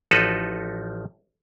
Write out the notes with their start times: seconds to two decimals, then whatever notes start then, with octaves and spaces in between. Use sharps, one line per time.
0.11 A1 F3 D#4 F#4 A4 B4